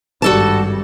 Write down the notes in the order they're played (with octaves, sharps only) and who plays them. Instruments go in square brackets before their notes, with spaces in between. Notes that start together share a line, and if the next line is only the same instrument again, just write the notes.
[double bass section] G#1 G2 G3 [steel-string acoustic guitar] F#4 A4 A5